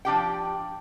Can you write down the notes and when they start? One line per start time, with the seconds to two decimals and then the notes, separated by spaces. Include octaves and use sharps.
0.05 F3 D4 G4 G5